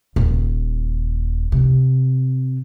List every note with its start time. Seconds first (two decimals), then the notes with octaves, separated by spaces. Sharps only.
0.16 D#1
1.52 C3